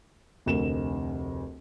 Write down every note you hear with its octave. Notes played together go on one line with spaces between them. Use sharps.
F1 D2 A#4 E7